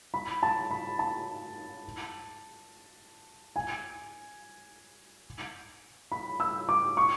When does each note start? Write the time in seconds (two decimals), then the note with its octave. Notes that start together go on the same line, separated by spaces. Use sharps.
0.14 B5
0.43 A5
0.71 B5
0.99 A5
3.56 G#5
6.12 B5
6.40 E6
6.69 D6
6.97 C#6